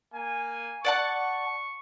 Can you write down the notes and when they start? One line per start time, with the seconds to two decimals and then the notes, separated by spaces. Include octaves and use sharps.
0.14 A#3 G#5
0.85 D5 F#5 A5 C#6